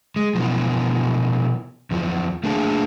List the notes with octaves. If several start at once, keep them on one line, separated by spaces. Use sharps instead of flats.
G#3
B2 E3 F3
E2 F3
A3 A#3 D4 G#4 A4 A5